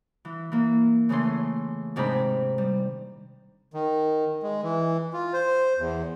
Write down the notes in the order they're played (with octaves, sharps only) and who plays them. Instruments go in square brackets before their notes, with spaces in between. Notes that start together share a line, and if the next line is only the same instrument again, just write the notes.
[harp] E3
E3 A#3
C#3 E3 A3 C#4 C6
G#2 C3 D#3 C4 D4 B5
G3
[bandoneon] D#3
G#3
E3
F4
C5
E2